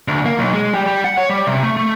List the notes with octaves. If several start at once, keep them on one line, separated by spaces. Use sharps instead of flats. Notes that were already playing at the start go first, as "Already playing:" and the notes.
D2
A#3
B1
G#3
G3
G3
F#5
C#5
G3
C3
A3
A3